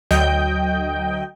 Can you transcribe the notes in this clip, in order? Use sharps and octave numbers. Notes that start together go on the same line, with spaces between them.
D2 F#3 D#5 G5 G6